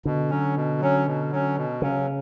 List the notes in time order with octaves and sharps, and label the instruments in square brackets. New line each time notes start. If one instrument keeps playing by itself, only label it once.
[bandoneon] B2 [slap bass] D3
[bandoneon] F#3 C#4
B2
F#3 C#4
B2
F#3 C#4
B2
[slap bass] C#3 [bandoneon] F#3 C#4